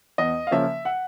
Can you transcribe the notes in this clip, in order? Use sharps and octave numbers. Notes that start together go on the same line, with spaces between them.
E2 D#5
F5
C#3 F3 A#3 C#4 E5
F#5